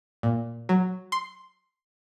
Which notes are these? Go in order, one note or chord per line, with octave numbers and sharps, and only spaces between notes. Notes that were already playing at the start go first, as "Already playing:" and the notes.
A#2
F#3
C6